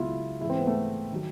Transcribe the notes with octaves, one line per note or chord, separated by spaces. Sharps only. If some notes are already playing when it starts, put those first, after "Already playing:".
Already playing: C#2 B2 F#3 E4 F4
G#2 E3 E4
C4
B3
A3
D#3 F#3